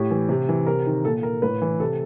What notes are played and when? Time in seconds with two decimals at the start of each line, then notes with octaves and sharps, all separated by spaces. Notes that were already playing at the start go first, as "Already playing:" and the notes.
Already playing: A2 G4
0.11 E3
0.29 C3
0.49 E3
0.67 C3 A#4
0.86 D#3
1.05 A#2 A4
1.23 A#4
1.42 A2 B4
1.62 E3
1.80 C3 A4